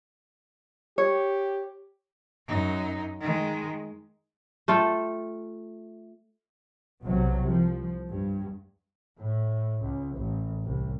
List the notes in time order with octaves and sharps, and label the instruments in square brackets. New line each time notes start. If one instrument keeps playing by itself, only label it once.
[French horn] G4 [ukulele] C#5
[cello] F#2 D#4
D#3 G#3
[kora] A3 F4 A4 G5
[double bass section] B1 C3 F#3
C2 F3
G2
A2
C#2
A1
C2